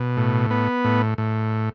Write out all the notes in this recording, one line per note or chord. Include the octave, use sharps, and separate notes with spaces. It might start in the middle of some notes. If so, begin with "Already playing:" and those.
Already playing: B2
A2
B3
A2
A2